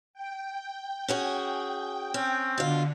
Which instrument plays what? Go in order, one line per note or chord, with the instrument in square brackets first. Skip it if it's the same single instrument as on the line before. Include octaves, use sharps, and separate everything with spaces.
[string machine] G5
[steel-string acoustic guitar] C#4 F#4 G#4
[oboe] C4 [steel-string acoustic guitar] C#4
[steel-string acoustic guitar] B2 F4 [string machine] D3